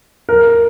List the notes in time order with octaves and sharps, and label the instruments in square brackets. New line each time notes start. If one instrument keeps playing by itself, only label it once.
[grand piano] A#4